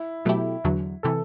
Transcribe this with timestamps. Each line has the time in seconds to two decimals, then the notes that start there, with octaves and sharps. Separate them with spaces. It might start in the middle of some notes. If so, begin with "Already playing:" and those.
Already playing: E4
0.25 B2 F#3 A3 E4 G4
0.64 E2 D3 F#3
1.03 C3 E3 A4